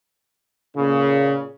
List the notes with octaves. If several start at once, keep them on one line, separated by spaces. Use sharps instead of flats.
A#2 C#3